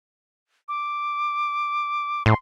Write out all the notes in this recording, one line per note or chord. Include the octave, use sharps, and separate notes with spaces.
D6
A2 C6